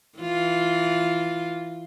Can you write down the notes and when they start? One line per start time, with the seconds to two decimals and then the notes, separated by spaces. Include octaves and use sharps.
0.19 E3 F4